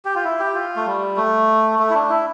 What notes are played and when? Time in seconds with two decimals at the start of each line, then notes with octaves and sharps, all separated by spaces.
0.05 G4
0.15 F4
0.25 E4
0.39 G4
0.54 F4
0.76 A3
0.86 G3
1.17 A3
1.79 A3
1.90 E4
1.95 D4
2.10 E4